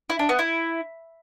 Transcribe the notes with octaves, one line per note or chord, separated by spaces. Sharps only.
E4
D4
B3
E4